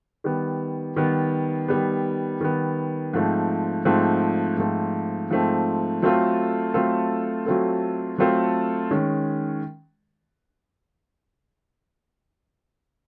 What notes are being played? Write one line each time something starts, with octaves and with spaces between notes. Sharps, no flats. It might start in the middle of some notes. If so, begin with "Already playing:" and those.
D#3 G3 B3
D#3 G3 B3
D#3 G3 B3
D#3 G3 B3
G#2 F3 A3 C4
G#2 F3 A3 C4
G#2 F3 A3 C4
G#2 F3 A3 C4
F#3 A3 C4 F4 A4
F#3 A3 C4 F4 A4
F#3 A3 C4 F4 A4
F#3 A3 C4 F4 A4
D#3 G#3 C#4